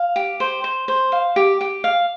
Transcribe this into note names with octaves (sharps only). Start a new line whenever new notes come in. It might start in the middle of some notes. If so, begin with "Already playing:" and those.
Already playing: F5
G4
C5
C5
C5
F5
G4
G4
F5